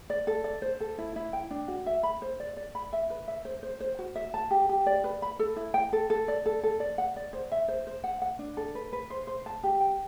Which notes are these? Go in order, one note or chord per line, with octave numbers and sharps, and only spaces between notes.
D5
A4
D5
C5
A4
E4
E4
G5
D4
F#4
E5
B5
C5
D5
D5
B5
E5
B4
E5
C5
C5
C5
F#4
E5
A5
G4
G4
D5
B4
B5
A4
E4
G5
A4
A4
D5
A4
A4
D5
F#5
D5
C5
E5
C5
C5
F#5
F#5
D4
A4
B4
B4
C5
C5
A5
G4
G5